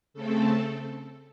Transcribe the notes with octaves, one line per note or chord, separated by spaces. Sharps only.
C#3 A3 C4 A4